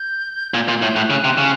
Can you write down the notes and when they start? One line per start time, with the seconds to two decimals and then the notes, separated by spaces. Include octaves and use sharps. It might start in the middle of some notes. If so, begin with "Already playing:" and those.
Already playing: G6
0.53 A#2 G#6
0.68 A#2 G#6
0.81 A2 G6
0.95 A2 F#6
1.10 C#3
1.24 C3
1.38 C#3